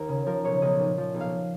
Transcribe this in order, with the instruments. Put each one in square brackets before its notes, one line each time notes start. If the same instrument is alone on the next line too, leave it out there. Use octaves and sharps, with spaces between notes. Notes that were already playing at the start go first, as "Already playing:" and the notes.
Already playing: [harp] D#2 A#4
C#3
F3 A#4
B1 C#5
B1 D#5
A#2
F3
B1
F5